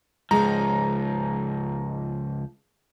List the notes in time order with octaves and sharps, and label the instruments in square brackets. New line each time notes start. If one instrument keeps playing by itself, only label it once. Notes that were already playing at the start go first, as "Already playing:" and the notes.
[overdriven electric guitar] C#2 F3 [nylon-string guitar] G#3 [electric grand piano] A#5